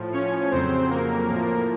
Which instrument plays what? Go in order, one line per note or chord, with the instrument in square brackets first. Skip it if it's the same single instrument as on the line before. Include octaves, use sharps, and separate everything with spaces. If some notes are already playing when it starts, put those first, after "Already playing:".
Already playing: [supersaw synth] A2 F3
C#4 C#5
F2 C#3 F#3 C4 C5
A#3 A#4
A2 F3